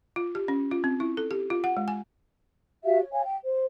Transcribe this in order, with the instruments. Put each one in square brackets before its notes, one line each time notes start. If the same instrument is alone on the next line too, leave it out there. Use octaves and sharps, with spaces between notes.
[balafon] F4
G4
C#4
F4
C4
E4
A4
G4
F4
F#5
G#3
G#5
[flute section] F#4 G4 E5 F5
C#5
C#5 F5 G#5
G5
C5